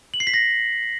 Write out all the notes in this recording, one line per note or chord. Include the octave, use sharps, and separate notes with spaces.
F#7
C7
B6
A#6